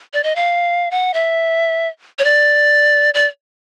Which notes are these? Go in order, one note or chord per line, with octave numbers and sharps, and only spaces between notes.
D5
D#5
F5
F#5
E5
C#5
D5
D5